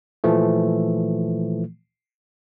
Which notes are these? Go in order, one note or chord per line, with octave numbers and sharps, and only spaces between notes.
A#2 E3 F3 A3